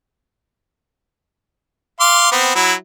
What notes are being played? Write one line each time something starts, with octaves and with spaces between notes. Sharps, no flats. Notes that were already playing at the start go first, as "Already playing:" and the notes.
F5 C6 D6
B3 C4
F#3 E4